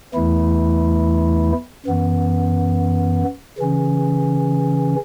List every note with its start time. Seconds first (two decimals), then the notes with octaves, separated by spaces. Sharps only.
0.14 E2 E3 A3 E4
1.86 F#2 E3 B3
3.58 C#3 E3 C#4